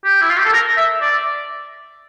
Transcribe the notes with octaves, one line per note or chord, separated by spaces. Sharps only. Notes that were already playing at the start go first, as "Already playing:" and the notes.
G4
E4
F4
G4
A4
A#4
E5
D5